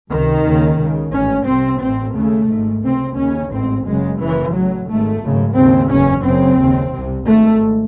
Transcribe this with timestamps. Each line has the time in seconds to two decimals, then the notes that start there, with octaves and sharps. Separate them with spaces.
0.10 C#2 C3 D#3
0.44 D#2 C#3
0.78 C#2 C#3
1.12 A1 G#2 C#4
1.46 C2 C3 C4
1.81 A1 A2 C4
2.15 D#2 C#3 A3
2.49 G#1 G#2
2.83 C#2 C3 C4
3.17 D#2 C#3 C#4
3.52 A1 G#2 C4
3.86 F#1 F#2 C#3 G#3
4.19 F#1 F#2 C#3 E3
4.53 A1 A2 F#3
4.89 G#1 G#2 A3
5.22 G#1 F#2 C#3
5.56 D#2 C#3 C4
5.90 F#1 E2 C#3 C#4
6.24 F#1 F#2 C#3 C4
6.59 D#2 C#3
6.93 C2 C3
7.26 G#1 G#2 A3